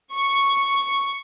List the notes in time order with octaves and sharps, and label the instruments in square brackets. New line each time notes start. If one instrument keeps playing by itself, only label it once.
[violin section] C#6